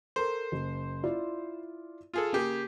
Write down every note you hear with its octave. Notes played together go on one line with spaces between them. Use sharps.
A4 A#4 C5
F#1
E4 F4 D5
F4 G#4 A4
C#3 A#3 G4 G#4